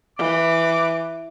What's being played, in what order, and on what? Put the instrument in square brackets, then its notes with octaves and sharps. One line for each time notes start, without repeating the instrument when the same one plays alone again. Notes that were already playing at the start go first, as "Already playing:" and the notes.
[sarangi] E3 [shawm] D6